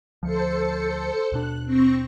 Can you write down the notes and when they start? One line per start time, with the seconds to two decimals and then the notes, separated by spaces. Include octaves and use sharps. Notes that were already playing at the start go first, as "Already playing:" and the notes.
0.23 D2 F3 A4 C5 C#7
1.32 D#2 B2 D4 F#6
1.66 C4 C#6 A#6